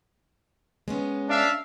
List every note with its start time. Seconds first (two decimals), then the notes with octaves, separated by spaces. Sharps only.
0.88 G#3 B3 C#4
1.29 D4 E5 F5